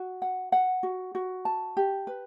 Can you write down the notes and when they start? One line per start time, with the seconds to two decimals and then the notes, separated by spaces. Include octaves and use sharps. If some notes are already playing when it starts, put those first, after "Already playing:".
Already playing: F#4
0.22 F#5
0.52 F#5
0.83 F#4
1.15 F#4
1.45 A5
1.77 G4
2.07 B4